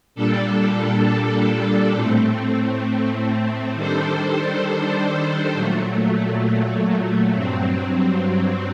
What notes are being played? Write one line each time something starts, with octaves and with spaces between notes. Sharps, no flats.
A#2 G3 D4 A4
A2 A3 C4
D#3 G3 D4 A4 C5
A#2 F#3 A3
G2 F#3 C4